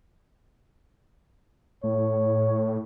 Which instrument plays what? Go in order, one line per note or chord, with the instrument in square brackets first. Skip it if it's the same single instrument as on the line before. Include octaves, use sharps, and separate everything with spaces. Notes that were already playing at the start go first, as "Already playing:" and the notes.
[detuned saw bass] A2 [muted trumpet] C#5